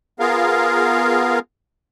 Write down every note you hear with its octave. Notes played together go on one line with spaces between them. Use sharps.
B3 F4 G#4 A#4 F5